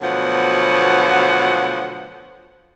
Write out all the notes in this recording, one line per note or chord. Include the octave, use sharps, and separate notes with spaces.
D2 B2 F3 F#3 B3 F#5